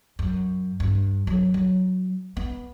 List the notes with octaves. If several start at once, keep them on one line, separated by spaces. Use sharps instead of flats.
F#2
G2
F#3
F#3
B3